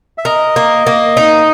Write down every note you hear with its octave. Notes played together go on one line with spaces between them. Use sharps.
E5
A#4 D#5
A#3
A#3
D#4